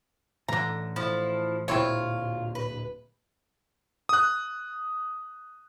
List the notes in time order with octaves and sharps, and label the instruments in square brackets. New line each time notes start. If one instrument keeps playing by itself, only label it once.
[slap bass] A2 E3 A3 [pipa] D3 A#5
[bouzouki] F3 E4
[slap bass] D1 A#2 [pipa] C4 E4 C#5 [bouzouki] F4
[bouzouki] B4
[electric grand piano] D#6 F#6